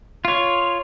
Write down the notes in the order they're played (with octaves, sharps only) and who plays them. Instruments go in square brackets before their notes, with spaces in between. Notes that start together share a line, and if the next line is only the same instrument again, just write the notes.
[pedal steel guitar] F4 C#5